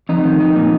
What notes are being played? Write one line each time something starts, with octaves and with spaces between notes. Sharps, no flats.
F2 D#4
D#3
F2 D#4
A#2